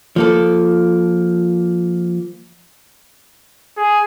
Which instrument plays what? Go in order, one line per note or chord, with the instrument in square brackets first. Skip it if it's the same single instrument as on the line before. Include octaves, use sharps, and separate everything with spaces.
[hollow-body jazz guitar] F3 A#3 A4
[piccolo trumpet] G#4